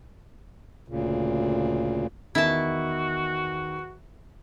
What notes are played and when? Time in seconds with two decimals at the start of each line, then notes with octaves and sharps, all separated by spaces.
0.88 D2 A#2 C#3
2.35 E2 D#3 E4 F#4 A5